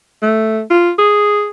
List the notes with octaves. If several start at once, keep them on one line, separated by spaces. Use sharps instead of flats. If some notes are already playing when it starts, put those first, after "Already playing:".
A3
F4
G#4